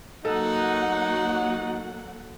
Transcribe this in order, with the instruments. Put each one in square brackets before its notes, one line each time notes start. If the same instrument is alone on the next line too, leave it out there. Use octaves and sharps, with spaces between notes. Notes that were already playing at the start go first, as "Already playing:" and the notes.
[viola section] F#3 A#3 F#5 [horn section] D#4 [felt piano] A4